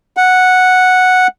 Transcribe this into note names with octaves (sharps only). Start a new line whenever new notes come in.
F#5